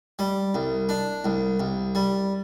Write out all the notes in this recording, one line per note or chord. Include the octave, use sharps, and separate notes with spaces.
G3
C2
D4
C2
C2
G3